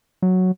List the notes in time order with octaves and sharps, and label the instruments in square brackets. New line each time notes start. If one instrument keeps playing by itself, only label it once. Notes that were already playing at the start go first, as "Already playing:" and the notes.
[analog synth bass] F#3